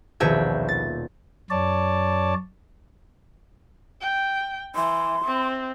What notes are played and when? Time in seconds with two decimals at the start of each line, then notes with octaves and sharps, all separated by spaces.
0.20 D#1 A#1 B2 E5 G5 G#6
0.69 A6
1.50 F#2 C#5 D5 A5
4.01 G5
4.75 E3 C6
5.25 C4